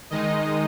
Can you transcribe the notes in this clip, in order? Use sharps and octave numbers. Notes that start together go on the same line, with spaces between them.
D#3 G#3 D#4 D#5